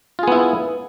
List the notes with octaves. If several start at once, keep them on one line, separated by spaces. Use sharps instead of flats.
B3 E4 F4 G#4